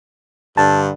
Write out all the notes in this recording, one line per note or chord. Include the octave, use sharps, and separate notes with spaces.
G2 D3 A5